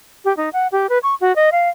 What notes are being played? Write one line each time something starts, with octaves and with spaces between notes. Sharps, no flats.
G4
D#4
F#5
G4
B4
C#6
F#4
D#5
F5